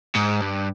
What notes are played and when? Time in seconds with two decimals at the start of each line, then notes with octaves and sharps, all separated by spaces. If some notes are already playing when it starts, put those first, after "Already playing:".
0.16 G#2
0.42 G2